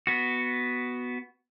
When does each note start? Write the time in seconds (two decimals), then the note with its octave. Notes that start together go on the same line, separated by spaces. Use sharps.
0.07 B3 F#4